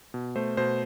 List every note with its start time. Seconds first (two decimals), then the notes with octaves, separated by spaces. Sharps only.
0.14 B2
0.36 A3 C5
0.57 B2 C5